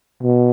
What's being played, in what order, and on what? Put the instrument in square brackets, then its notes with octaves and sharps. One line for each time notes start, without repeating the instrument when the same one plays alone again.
[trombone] B2